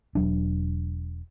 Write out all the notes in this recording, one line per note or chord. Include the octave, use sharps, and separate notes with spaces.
E1 F#3 D4